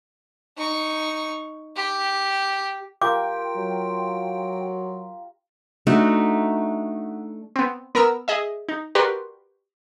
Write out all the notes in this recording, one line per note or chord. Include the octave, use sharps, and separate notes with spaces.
D#4 C#6
G4
F4 G4 A#4 G5 D6
F#3
A3 D4 D#4 F#4
B3 C4
B3 A#4 A#5 E6 F6
G#4 D#5 E5
D#4
F#4 G4 A#4 B4 D5 C6